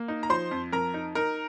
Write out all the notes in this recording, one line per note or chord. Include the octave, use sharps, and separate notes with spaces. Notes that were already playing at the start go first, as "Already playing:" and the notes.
Already playing: A#3
D#4
A#5
F3 C5 C6
F2
F2 A#4 A#5
D#4
D#4 A#4 A#5